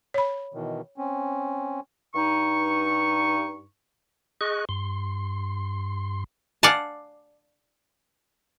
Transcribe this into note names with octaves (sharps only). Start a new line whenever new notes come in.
C#5 B5
B2 D#3 E3
C4 C#4
G2 D#4 C#6
G#4 D#5 C#6 F#6
G2 C6
D5 F5 F#5 G#5 A5